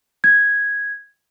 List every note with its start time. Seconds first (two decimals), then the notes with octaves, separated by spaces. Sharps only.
0.24 G#6